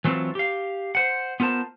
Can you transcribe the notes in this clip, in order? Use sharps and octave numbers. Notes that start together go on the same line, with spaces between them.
E3 F#3 A3 C4 F4
G4 F5
C5 F#5
B3 F4 A#4 C5 A5